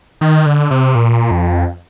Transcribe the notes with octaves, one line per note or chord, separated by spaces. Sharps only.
D#3
D3
C3
A#2
F2